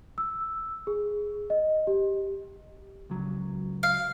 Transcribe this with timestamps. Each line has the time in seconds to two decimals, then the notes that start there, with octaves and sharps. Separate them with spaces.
0.18 E6
0.87 G#4
1.50 D#5
1.87 G4
3.10 C#2 F#3
3.83 F5